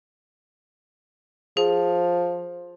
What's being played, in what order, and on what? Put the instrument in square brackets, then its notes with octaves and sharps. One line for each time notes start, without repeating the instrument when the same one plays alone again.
[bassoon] F3 [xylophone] G#4